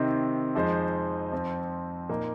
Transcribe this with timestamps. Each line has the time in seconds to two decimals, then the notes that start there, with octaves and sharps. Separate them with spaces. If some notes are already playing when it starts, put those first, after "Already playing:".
Already playing: C3 D#3 C4 D#4 C5
0.55 F2 F3 G#3 D#4 C5
1.32 F2 F3 C4
2.09 A#2 A#3 D#4 A#4